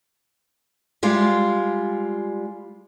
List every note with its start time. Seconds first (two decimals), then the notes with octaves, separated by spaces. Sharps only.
1.03 G3 G#3 F4